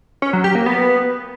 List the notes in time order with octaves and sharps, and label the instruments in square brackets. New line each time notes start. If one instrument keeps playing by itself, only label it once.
[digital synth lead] C#4
F#3
G4
A#3
B3